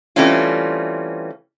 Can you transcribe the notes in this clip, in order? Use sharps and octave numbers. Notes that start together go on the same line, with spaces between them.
E3 G3 A3 C4 C#4 F4